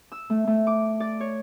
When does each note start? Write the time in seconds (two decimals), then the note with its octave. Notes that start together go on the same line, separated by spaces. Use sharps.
0.12 E6
0.30 A3
0.47 A3
0.67 D6
1.00 D5
1.20 C#5